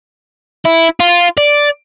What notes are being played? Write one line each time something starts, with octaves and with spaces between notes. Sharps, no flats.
E4
F4
D5